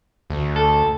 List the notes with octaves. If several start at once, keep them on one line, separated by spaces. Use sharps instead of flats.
D2
A4